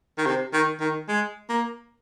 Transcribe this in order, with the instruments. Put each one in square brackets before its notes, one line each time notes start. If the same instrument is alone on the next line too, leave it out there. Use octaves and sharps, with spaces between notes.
[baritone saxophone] D#3
C3
D#3
D#3
G#3
A#3